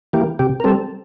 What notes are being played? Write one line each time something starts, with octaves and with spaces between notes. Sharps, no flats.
E3 A#3 G4
C3 G4
A#4
G3 C4 A4